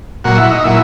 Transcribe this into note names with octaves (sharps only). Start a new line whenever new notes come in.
A#2 F#3 F#4
E4
D#4
A#2 F#3 E4